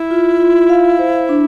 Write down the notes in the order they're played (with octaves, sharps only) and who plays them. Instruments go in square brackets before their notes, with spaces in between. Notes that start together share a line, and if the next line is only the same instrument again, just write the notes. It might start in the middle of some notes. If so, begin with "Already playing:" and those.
Already playing: [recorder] E4
[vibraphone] F4
F4
F5
C5
D4